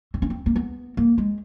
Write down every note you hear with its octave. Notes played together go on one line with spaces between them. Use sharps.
C4
C#4
C4
A#3
B3
A#3
G#3